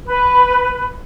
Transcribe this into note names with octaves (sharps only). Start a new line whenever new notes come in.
B4